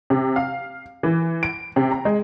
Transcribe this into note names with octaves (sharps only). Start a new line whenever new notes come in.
C3
F5
E3
D7
C3
A#5
G#3